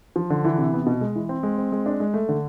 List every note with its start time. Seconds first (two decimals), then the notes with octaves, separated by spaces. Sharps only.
0.16 F3
0.30 D3
0.44 E3
0.58 C3
0.73 B3
0.86 B2
1.01 G#3
1.15 E3
1.29 C4
1.43 G#3
1.58 C4
1.72 G#3
1.86 D4
2.00 G#3
2.14 A3
2.29 D3